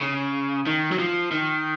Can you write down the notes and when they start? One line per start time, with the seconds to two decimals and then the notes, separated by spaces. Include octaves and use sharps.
0.01 C#3
0.67 D#3
0.92 F#3
0.99 F3
1.32 D#3